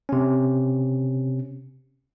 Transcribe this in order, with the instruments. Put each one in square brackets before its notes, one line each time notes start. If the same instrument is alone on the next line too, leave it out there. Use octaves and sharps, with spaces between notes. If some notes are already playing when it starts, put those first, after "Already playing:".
[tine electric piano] C3 C#4